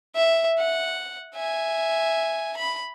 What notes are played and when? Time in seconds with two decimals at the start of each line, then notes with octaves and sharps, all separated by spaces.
0.16 E5
0.59 F#5
1.35 E5 G#5
2.57 B5